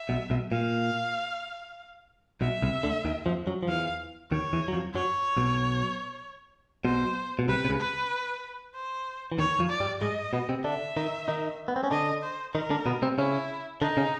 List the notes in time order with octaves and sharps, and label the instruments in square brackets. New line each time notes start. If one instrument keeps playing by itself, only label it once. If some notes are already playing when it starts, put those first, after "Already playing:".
Already playing: [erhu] E5
[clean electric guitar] B1 B2
B1 B2
[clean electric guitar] A#2 [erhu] F5
[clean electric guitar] B1 B2 [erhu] E5
[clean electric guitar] C2 C3
D2 D3
D#2 D#3
F2 F3
F#2 F#3
F3
[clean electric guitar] E2 E3 [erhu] F5
[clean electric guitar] D#2 D#3 [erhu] C#5
[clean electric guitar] E2 E3
F#3
F2 F3
[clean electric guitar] F#2 F#3 [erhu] C#5
[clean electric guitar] B1 B2
[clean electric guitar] B1 B2 [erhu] C5
[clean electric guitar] B2
[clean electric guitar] C2 C3 [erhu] B4
[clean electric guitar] C3
C#2 C#3
[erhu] B4
C5
[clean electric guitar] E3
[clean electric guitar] D#2 D#3 [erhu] C#5
[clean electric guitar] F2 F3
[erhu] D5
[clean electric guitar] G2 G3
[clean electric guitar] G#2 G#3 [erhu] D#5
[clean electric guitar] B2 B3
C3 C4
[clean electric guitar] D3 D4 [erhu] E5
[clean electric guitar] D#3 D#4
D#3 D#4
B3
C4
C#4
[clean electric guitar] D3 D4 [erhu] D#5
[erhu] C5
[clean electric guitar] D#3 D#4 [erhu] A#4
[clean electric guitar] D3 D4
B2 B3
C3 C4
[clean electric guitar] C#3 C#4 [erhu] E4
[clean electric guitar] D3 D4 [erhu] D#4
[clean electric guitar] C#3 C#4